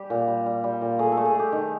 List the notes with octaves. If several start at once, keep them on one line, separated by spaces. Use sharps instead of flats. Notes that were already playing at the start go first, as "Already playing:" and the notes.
Already playing: G3 G4
A#2
G3
G3
G3
A#2
A3 G#4
A4
A3
G#4
A3 G4
D#3